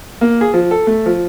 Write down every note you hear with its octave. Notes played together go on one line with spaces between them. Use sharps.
A#3
G#4
F3
A4
A3
F3